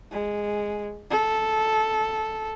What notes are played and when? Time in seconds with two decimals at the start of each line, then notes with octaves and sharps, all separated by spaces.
0.11 G#3
1.11 A4